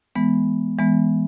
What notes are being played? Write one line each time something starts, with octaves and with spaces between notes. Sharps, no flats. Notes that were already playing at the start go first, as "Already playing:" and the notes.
E3 G#3 B3
E3 G#3 B3